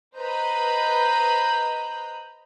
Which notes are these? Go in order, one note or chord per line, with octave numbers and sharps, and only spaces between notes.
B4 C5 D#5 A#5 B5 G6